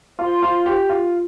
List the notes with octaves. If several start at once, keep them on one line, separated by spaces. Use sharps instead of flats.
F4 C5 F5 C6
F4
G4
F4